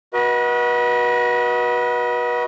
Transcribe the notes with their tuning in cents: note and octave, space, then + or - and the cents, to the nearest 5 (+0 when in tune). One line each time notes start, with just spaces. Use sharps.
F#4 +0 B4 -30 D#5 +20